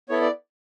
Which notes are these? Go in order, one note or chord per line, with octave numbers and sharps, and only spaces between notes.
B3 E4 A4 C#5
D5